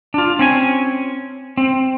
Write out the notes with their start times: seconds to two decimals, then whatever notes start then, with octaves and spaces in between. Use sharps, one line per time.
0.14 D4 F4
0.39 C4 C#4 G#5
1.57 C4